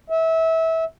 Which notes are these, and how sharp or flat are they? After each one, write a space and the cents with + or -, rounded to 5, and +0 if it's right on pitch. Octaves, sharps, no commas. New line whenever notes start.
E5 -25